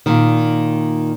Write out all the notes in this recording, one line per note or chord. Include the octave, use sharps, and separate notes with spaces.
A#2 D#3